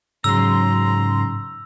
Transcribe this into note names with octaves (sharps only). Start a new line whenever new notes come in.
G#2 C#3 F#3 A#5 C6 E6